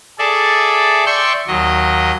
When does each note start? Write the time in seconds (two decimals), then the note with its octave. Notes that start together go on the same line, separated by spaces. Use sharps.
0.19 G#4 A4 D5 E5
1.06 D5 E5 G5 C6 C#6
1.48 D#2 F#3 D#5